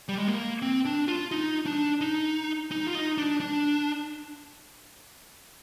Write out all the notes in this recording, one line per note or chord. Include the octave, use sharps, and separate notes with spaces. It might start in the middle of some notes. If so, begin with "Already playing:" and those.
G3
G#3
A#3
C4
D4
F4
D#4
D4
D#4
D#4
F4
D#4
D4
D4